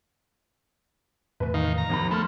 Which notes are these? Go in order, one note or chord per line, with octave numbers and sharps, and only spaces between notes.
E2 A2 C3 B4
D#3 F5
A#5
G#1 D#2 F3 B3 B5
A3 B5 C6 F6